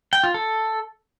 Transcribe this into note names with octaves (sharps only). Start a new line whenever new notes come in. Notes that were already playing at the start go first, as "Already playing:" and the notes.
G5
F4
A4